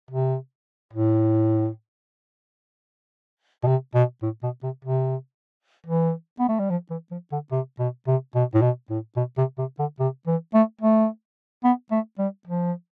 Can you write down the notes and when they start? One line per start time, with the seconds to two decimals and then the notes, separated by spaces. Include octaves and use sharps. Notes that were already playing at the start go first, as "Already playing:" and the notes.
0.11 C3
0.93 A2
3.63 B2
3.67 C3
3.94 B2
4.22 A2
4.43 B2
4.63 C3
4.85 C3
5.87 E3
6.40 B3
6.49 A3
6.59 G3
6.70 F3
6.90 E3
7.11 F3
7.32 D3
7.51 C3
7.79 B2
8.07 C3
8.35 B2
8.54 A2
8.62 B2
8.90 A2
9.16 B2
9.38 C3
9.58 C3
9.79 D3
9.99 C3
10.27 E3
10.54 A3
10.81 A3
11.64 B3
11.91 A3
12.18 G3
12.47 F3